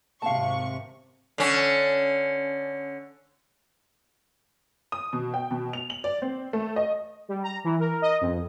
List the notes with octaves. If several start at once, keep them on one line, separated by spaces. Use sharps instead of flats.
G#1 C3 F5 A5 C#6
D3 C#4
D#6
B2
G5
B2
F7
F#7
D5
C4
A3
D#5
G3
A#5
E3
A#4
D#5
F2